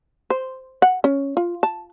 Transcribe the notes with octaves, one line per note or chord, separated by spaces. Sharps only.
C5
F#5
C#4
F4
A5